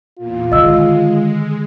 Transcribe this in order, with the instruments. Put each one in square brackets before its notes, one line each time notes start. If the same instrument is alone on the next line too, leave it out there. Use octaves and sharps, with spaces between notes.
[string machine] E2 A#2 [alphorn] F4
[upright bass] D3 D#3 [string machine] G#3 [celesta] D#5 E6